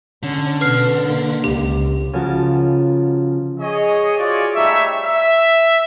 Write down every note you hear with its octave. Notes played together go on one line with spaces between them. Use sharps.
D3 C#4
B2 B4 F6 C7
A#3
C#2 G4
C#3 F3 F#4 A#4 A5
G#4 C#5 D#5
F4 F#4 G#4 C#5 D5
G3 A3 D#4 G4 C#5 E5
E5